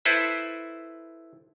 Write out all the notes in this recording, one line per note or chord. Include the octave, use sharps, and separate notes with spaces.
E4 A4 B4 C5